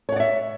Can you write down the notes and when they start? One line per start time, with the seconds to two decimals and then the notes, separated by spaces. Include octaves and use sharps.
0.09 C#5
0.12 F#5
0.16 D5
0.20 E5